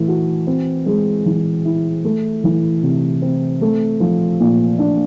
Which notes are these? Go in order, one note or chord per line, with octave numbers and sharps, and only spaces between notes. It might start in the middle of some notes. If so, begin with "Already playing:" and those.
Already playing: E3 A3
F#4
C4
G#3
E3
E4
A3
E3
C3
C4
A3
F3
A#2
D4